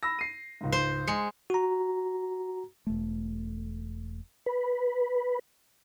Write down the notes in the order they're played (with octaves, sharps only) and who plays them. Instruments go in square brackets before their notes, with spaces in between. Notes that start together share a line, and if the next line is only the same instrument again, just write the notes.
[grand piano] B5 E6 A#6
C7 D#7
C#2 G#2
[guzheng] C5
[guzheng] G#3 [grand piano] C#7
[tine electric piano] F#4 A#5
[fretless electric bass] E1 A3
[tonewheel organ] B4